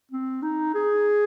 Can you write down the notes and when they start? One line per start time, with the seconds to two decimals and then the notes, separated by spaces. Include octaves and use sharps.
0.11 C4
0.42 D#4
0.74 G#4